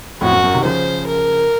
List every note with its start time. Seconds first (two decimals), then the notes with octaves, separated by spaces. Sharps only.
0.21 F2 A2 F#4
0.32 F#2
0.44 F#2
0.54 C3 D#3
0.65 C#3 F3 C5
1.07 A#4